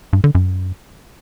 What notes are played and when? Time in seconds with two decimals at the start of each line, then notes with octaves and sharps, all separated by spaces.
0.13 G2
0.24 D3
0.35 F#2